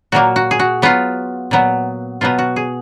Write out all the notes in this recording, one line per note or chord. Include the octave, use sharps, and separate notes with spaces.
A#2 F#3 A#3 F#4
F#4
G#4
F#4
F#3 B3 F4
A#2 F#3 B3
B2 F#3 B3 F4
F#4
G#4